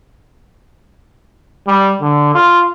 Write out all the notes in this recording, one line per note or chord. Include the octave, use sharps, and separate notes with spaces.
G3
D3
F4